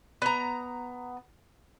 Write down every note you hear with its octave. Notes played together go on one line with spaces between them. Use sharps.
B3 A#5